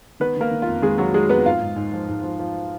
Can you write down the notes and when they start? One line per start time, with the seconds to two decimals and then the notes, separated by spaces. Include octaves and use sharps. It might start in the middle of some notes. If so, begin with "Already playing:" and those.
0.20 D#3 B3 B4
0.36 D#3 A#3 A#4
0.51 D#3
0.62 F4
0.67 F2
0.82 D#3 G#3 G#4
0.98 D#3 F#3 F#4
1.14 D#3 G#3 G#4
1.29 F2 B3 B4
1.45 G#2 F4 F5
1.61 G#2
1.76 G#2
1.93 F3
2.09 G#2
2.24 F3
2.39 F3